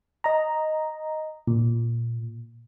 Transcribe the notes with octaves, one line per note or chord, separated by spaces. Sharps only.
D#5 A#5
A#2